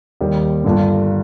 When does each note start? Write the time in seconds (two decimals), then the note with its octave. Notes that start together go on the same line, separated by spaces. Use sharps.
0.21 D#2 D#3 G3
0.64 G1 G2 D3